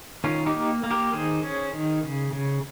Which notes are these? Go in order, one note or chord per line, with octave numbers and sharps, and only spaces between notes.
D#3 C#4 F4
D#4 G4
A#3
A#3
G4 A#4
D#3 G#4 C5
C#4
D#3
C#3
C#3